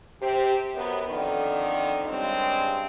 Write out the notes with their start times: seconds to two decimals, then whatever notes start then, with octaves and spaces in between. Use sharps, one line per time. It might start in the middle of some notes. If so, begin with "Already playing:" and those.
0.22 C3 C4 G4
0.74 F#2 B3
1.08 F2 D3 D#3
2.06 G2 C#3 G#3 C4